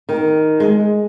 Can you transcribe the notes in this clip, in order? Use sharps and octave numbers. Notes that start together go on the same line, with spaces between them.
D#3
G#3